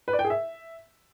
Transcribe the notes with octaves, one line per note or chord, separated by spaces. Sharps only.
B4
D5
G5
G#4
E5